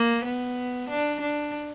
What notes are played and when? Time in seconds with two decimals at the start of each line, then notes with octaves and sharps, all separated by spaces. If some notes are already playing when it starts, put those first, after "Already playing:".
Already playing: A#3
0.25 B3
0.89 D4
1.21 D4